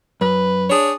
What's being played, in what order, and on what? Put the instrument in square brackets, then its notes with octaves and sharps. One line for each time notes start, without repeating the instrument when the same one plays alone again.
[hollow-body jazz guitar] F#2 [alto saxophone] B4
[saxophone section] D4 G#4 C#5